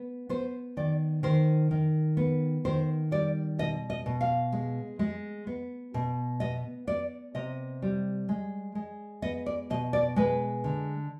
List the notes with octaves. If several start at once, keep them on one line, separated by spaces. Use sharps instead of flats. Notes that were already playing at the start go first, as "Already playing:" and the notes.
Already playing: B3
B3 C5
D#3 D5
D#3 C5
D#3
B3
D#3 C5
G3 D5
B2 D#5
D#5
B2
F5
G#3
G#3
B3
B2
B3 D#5
B3 D5
C3 D#5
G3
G#3
G#3
B3 D#5
D5
B2 D#5
D5
G#3 B4
D3